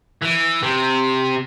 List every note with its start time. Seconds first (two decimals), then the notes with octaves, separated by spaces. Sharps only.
0.22 E3
0.63 C3